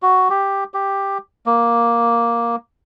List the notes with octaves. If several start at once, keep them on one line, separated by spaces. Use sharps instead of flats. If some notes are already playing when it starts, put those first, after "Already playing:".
F#4
G4
G4
A#3